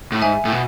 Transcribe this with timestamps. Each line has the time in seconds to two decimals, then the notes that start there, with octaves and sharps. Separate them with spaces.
0.12 A2
0.22 G#2 E5 G#5
0.45 A2
0.52 B2